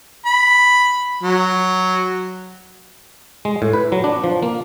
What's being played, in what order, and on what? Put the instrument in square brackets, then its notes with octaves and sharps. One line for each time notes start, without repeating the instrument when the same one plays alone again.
[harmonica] B5
F#3
[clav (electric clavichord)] G#3
A2
B4
F#3
D4
F3
A#3